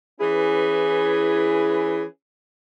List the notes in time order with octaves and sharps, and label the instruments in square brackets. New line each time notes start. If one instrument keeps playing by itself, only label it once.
[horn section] E3 C#4 E4 G#4 B4